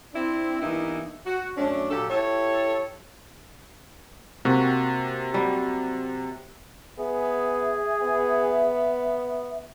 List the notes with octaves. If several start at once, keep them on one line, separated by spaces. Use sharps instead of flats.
C4 D4 E4
G2 E3 A#3 B3 D#4 E4
F#4
F#2 A3 C#4 D4
A#2 F#3 G4 A4
E4 G4 A4 C#5
C3 A#3 F#4
F#3 G3
B3 G#4 E5
B3